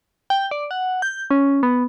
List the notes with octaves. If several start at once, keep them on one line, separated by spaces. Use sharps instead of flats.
G5
D5
F#5
G6
C#4
B3